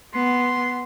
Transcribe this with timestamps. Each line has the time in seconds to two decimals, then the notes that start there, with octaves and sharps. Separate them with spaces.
0.14 B3 C6